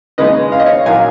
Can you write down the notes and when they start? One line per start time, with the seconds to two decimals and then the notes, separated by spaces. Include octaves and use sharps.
0.18 C#3 G#3 D#4 B4 D#5
0.52 F5
0.59 D#5
0.66 C#5 F5
0.86 A#2 F#3 A#3 D#4 F5 G#5